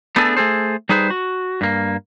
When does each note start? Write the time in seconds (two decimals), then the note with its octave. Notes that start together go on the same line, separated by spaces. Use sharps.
0.16 A3 B3 D4 G#4 A4
0.37 A3 G#4 A4 C5
0.89 G3 D#4 G#4 B4 C5
1.10 F#4
1.61 G2 A#3